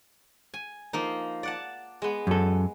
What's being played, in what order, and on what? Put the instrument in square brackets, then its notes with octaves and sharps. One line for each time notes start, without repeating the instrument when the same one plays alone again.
[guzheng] G#5
F3 A#3 D#4
D5 F#5 A5
G#3 B3
[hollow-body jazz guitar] F#2 A4